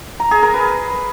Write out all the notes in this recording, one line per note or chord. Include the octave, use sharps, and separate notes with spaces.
A#5
G#4
A#4
B4